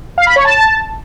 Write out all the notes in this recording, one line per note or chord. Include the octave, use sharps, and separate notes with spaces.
F5
B5
C#5
A5